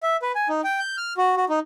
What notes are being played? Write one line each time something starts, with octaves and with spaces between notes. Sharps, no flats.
E5
B4
G#5
D#4
G5
G6
F6
F#4
F#4
D#4